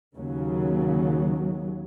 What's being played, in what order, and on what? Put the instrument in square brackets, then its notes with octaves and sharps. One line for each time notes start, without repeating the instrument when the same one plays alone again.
[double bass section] D#2 C#3 F#3